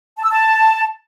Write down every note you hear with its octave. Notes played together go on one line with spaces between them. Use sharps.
A5
E6
A5